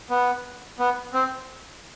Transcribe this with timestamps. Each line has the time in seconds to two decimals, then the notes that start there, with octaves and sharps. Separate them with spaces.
0.10 B3
0.79 B3
1.14 C4